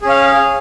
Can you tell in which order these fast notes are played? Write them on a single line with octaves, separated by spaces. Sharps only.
G#4 C#4 F5